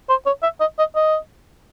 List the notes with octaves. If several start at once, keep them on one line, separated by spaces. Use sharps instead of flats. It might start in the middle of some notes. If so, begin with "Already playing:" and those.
C5
C#5
E5
D#5
D#5
D#5